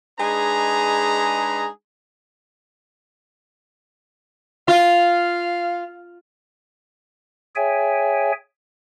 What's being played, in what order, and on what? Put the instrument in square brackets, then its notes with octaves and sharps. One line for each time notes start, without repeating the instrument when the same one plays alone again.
[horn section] G#3 D4 D#4 G#4 B4 A#5
[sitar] F4 [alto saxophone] F5
[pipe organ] G#4 C#5 E5 G5 G#5